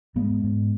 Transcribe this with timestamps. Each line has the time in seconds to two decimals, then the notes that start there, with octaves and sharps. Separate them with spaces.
0.15 G#2 G#3 B3
0.30 G#2
0.44 G#2